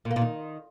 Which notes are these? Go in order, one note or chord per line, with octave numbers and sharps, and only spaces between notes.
A#2
A#3
A#2
D#3